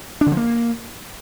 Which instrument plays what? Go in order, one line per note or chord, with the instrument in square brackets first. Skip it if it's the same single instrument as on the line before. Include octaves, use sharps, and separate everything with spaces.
[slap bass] D4
D3
F3
A#3